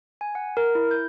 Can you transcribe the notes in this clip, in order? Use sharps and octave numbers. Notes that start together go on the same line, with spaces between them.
G#5
F#5
A#4
E4
G6